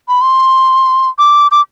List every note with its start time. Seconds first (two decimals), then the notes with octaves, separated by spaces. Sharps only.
0.09 B5
0.22 C6
1.19 D6
1.51 D6